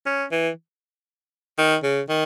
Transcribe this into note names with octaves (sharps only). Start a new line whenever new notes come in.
C#4
E3
D#3
C#3
D#3